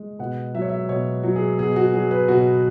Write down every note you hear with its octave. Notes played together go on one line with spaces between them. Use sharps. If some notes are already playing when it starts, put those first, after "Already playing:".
Already playing: G#3
B2 F#5
F#3 E5
C#5
E5
B2 C#5
F#3
G#4
B2 G#4
F#4
F#3 G#4
B4
B2 F#4